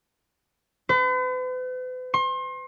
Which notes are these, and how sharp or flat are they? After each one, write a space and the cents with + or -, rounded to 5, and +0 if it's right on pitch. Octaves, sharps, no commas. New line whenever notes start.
B4 +45
C6 +35